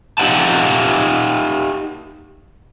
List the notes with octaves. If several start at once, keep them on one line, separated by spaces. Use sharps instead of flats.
D#4 G4 F5 F#5 A5